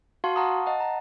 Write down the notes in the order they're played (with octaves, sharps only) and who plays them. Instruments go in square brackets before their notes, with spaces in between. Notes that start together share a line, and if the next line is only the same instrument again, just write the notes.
[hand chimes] F#4 F5 F#5 A5 C6 C#6
F5 F#5 A5 A#5 C#6 D#6
D#5 F#5 A5
A#5